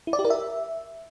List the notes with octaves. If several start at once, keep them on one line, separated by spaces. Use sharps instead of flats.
E4
D5
G4
A#4
E5